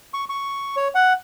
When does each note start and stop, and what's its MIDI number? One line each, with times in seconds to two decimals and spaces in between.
0.14 0.25 85
0.29 0.76 85
0.76 0.88 73
0.95 1.13 78